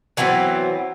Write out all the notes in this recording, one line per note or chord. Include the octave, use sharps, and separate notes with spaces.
E3 F#3 B3 C4